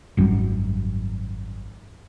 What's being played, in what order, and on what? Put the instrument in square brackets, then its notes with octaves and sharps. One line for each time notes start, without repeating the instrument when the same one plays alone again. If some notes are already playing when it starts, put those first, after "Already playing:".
[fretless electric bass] G#1 F#2 A2 G3